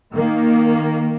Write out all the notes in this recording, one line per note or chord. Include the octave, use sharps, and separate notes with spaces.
D#3 A#3